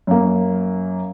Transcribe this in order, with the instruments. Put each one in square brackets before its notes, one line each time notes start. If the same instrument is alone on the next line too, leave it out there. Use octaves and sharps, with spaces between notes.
[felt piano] F#2 A#3